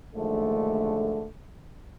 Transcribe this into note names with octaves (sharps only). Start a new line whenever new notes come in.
A#1 D#2 D3 G#3 A3